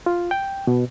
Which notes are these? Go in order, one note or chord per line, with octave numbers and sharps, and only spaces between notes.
F4
G5
B2